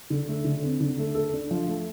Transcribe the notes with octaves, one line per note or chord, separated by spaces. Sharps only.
D3
A3
D3
C4
D3
A3
A4
D4
F3
A3